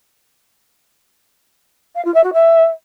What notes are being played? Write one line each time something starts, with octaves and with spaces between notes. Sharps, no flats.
F5
F4
E5
F#4
E5